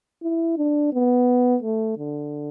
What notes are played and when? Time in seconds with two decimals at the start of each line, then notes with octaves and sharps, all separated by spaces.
0.23 E4
0.58 D4
0.93 B3
1.63 A3
1.98 D3